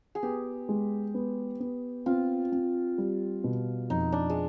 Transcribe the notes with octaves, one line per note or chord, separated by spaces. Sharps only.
G#4
B3 G4
G#3
B3
B3
C4 F4
C4
G3
B2
F2 D#4
D4
G#3